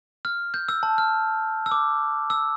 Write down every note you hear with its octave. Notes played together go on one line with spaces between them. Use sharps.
F6
G6
E6
A5
F6
E6
D6
E6